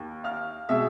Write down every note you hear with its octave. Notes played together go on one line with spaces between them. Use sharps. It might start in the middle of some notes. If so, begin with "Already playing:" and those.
Already playing: D#2
F5 F6
B2 G#3 E5 E6